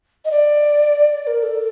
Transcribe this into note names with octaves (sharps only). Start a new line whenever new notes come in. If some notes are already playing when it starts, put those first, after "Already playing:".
D#5
D5
A#4
A4